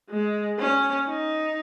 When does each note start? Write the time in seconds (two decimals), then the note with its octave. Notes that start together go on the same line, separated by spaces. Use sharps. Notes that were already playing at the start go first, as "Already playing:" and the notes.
0.10 G#3
0.59 C#4
1.08 D#4